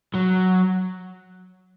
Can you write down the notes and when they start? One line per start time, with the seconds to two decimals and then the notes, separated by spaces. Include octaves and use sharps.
0.15 F#3